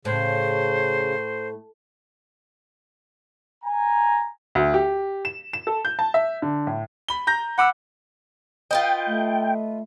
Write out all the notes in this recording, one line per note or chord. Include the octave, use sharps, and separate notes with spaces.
A2 C#3 C5
G#5 A#5
D2
G4
E7
E7
A4
G6
A5
E5
D3
A2
B5 G7
A#5 G6 A#6
F#5 B5 D6 E6
F4 B4 D#5 G5
A3